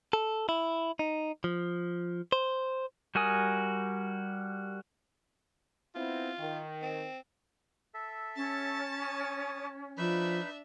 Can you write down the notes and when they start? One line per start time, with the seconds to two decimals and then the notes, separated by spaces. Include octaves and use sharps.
0.13 A4
0.49 E4
0.99 D#4
1.44 F3
2.32 C5
3.15 G3 F#4 A#4 G#5 D#6
5.95 B3 C4 E4 F4
6.39 D#3
6.82 C4
7.94 A4 E5
8.36 C#4 A5 A6
9.02 C#5 D#6
9.98 F3 D4 D#4 B4 E5 B5